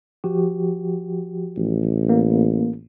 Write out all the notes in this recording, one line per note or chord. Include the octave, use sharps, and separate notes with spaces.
F3 F#4 G4
A1
A#3